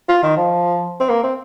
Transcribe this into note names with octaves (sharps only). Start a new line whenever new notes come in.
F4
D#3
F3
C4
A#3
C4